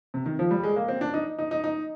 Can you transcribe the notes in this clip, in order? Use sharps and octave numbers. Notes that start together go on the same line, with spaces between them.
C3
D#3
F3
G3
G#3
A#3
C4
D4
D#4
D#4
D#4
D#4